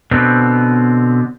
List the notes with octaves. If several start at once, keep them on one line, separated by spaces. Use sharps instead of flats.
B2 D3 B3 C4